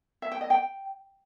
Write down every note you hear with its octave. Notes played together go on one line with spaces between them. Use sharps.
E5
G5
D#5
G5